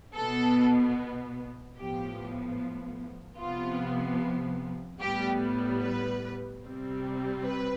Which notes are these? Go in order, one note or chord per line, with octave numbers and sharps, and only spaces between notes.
B2 B3 A4
A2 F3 B3 G4
C3 F3 B3 F4
A2 G3 B3 G4
B4
C3 G3 C4
B4